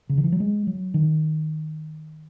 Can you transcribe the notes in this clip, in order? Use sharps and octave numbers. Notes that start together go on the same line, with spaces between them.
C#3
D#3
E3
F#3
G#3
F#3
D#3